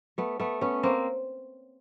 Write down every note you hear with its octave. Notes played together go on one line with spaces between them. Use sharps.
A3 B3
A3 B3
B3 C#4
A#3 C4